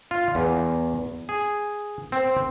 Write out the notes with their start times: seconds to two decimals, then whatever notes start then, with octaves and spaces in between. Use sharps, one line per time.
0.11 F4
0.35 E2
1.29 G#4
2.12 C4